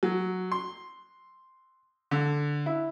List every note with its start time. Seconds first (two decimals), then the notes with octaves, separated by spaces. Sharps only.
0.03 F#3
0.52 C6
2.11 D3
2.66 E4